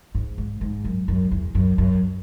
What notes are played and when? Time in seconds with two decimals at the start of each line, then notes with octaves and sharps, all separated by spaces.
0.15 G#2
0.38 G#2
0.61 G#2
0.84 F#2
1.08 F#2
1.32 E2
1.55 F#2
1.78 F#2